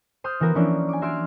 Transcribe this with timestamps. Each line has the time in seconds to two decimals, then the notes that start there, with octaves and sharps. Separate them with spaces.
0.24 C5 C6 D#6 F6 G6
0.40 E3 B3 F#4 A#4
0.55 E3 F3 A#3 C#4 D4 E4
0.89 G#5 D6
1.02 F#4 E5 C6 F6 G#6 D7